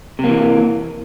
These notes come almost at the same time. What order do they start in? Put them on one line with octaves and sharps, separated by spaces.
C3 A#3 E3